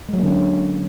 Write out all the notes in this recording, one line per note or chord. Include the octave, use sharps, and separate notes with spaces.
D3 F#3 G#3 A#3 C#4